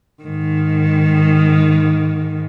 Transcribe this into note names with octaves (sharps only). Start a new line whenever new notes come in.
G#2 D#3